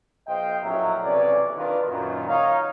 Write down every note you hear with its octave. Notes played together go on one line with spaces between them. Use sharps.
B1 C5 D#5 F5 G5
A#1 A2 F#3 C#4 A#4 E5
B1 C3 E3 C#4 D5
D#3 D4 F4 A#4 B4
F#2 A#2 D#3
D#4 C#5 F5